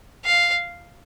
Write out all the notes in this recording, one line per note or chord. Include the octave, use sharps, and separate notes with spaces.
F5